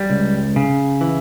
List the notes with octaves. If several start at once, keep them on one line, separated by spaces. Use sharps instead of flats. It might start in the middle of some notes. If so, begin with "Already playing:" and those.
Already playing: G3
C#2
C#3
E3